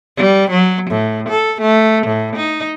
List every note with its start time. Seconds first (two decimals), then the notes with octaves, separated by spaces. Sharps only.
0.17 G3
0.51 F#3
0.90 A2
1.29 A4
1.61 A3
2.07 A2
2.36 D#4